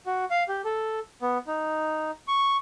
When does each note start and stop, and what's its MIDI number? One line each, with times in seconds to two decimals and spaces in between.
0.06 0.25 66
0.31 0.43 77
0.48 0.62 67
0.64 1.00 69
1.22 1.38 59
1.47 2.11 63
2.28 2.57 85